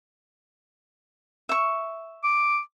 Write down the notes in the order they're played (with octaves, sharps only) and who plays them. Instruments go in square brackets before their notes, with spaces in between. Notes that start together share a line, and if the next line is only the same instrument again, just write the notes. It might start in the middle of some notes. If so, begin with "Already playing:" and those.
[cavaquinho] E5 C#6
[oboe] D6